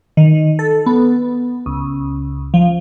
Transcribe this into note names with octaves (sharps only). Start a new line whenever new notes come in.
D#3
A4
B3
C#2
F3